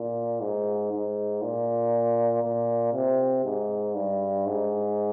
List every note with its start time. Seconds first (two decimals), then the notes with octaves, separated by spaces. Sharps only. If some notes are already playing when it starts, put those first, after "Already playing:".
Already playing: A#2
0.41 G#2
0.92 G#2
1.42 A#2
2.43 A#2
2.94 C3
3.45 G#2
3.96 G2
4.46 G#2